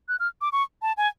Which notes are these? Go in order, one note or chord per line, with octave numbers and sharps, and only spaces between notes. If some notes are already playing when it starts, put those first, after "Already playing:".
F#6
F6
D6
C#6
A5
G#5